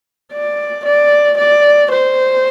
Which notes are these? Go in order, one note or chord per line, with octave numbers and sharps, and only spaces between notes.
D5
D5
D5
C5